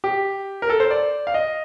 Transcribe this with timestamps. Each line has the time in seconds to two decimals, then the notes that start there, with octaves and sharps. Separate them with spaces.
0.04 G4
0.62 A#4
0.69 A4
0.80 C5
0.91 D5
1.27 F5
1.34 D#5